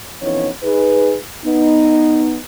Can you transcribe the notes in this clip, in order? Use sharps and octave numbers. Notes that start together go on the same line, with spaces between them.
F2 E3 B3 C#4 D#4 C#5
D#4 G#4 B4
B3 D#4